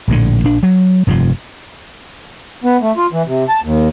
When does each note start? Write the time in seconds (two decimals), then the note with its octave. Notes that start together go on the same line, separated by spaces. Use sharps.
0.08 A#1 A2 D3
0.44 A#1 D4
0.63 F#3
1.07 F1 G2 B2 F3
2.64 B3
2.82 A3
2.97 F4
3.12 E3
3.27 C3
3.49 A5
3.64 D#2